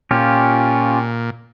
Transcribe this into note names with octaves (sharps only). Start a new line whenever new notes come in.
A#2 C#4 F4 G4